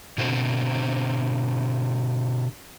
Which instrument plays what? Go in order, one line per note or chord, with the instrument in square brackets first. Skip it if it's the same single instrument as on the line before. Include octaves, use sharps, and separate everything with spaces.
[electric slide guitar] B2 D3 C4 F#4 C5